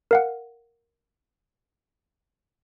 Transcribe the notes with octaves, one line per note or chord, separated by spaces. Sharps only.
A#4 F5 F#5